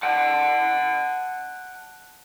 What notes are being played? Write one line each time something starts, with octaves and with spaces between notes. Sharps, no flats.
F#5 A5